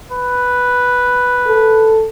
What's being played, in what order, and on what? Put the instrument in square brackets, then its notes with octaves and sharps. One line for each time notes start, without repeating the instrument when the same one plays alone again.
[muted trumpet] B4
[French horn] A4